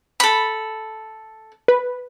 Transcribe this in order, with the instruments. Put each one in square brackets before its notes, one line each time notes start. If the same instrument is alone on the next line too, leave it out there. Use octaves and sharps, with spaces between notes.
[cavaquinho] A4 B5
[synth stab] B4